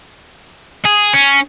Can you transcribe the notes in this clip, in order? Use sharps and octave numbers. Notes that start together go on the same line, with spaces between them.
G#4
C#4